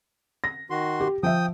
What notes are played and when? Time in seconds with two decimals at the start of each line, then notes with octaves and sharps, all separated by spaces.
0.44 A#6
0.70 D#3 F#4 C6
1.00 G4
1.23 F3 E5 G5 D#6